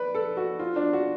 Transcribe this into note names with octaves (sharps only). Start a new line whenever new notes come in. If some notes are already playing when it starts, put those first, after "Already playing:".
Already playing: B4 D5
A4
F#4
F4
D4
F#4